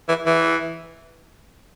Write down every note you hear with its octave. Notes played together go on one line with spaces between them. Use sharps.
E3
E3